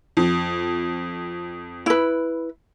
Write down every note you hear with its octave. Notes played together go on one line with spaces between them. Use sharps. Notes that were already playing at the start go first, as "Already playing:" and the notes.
F2
E4 B4